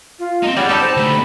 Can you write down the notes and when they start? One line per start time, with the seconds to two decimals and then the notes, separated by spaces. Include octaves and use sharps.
0.19 F4
0.43 C4 D#4 D#5
0.57 G3 G#4 D5 F#5
0.69 D#4 G4 A4 A5 B5
0.81 C5
0.97 D3 A3 B5